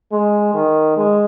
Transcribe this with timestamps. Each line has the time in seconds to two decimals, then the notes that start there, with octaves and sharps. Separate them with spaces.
0.11 G#3
0.54 D#3
0.97 G#3